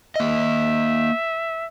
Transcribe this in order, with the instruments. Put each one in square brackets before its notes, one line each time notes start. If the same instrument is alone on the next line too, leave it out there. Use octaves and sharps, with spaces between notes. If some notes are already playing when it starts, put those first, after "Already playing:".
[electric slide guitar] A#3 D#5 [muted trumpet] E5